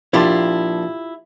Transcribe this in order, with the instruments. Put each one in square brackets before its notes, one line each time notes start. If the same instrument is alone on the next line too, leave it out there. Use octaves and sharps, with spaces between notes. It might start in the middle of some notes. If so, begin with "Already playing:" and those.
[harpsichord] A#1 A5 C6 [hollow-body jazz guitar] E4 F4 G4